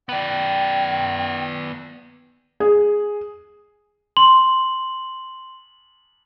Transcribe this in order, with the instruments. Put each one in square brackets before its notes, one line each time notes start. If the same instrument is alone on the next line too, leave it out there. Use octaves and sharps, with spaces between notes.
[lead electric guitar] B3 D5 [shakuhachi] G5
[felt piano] G#4
[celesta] C6 [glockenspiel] F#7